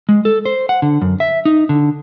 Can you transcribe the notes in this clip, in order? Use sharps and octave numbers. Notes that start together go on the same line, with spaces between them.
G#3
A4
C5
F#5
D3
F#2
E5
D#4
D3